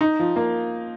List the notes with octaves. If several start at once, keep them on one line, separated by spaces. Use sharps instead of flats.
D#4
F3
A#3